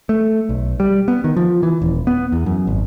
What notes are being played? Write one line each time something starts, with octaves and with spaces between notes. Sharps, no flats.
A3
B1
G3
B3
D#3
F3
E3
D#1
B3
E2
F#2
G#1